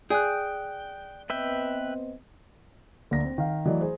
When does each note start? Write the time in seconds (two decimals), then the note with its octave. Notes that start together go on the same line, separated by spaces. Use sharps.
0.10 G#4 D5 G5 F#6
1.30 B3 C4 B4 D#5 E5 G5
3.11 D2 A#3 D4 A#6
3.25 C4
3.38 D#3 F5
3.66 E3 F#3 A3 D5 D#5
3.81 G#4 C5